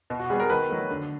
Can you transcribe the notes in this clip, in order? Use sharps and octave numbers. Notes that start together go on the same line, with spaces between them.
B2
F#4
G3 B3 G#4
A#4
D#3 B4
F#3 A3
D3